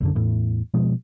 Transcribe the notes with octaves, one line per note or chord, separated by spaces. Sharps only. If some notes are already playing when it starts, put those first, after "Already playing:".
B1 F#2 D3
E2 A2
B2 F3 G#3